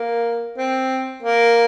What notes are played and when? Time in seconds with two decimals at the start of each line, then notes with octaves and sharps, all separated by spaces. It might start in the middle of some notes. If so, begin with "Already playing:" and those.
Already playing: A#3
0.58 C4
1.23 A#3